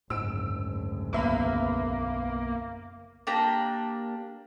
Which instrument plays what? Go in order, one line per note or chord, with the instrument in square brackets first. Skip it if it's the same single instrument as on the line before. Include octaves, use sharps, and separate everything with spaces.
[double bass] F#1 D2 [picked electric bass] G#2 [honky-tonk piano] E6 D7
[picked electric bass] B1 B3 [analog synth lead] A#3 [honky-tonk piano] B4 E5 B5
[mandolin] A#3 D4 G4 A#5